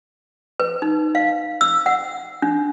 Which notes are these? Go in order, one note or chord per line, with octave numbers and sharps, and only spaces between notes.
B4
D#4
F5
E6
F#5
D4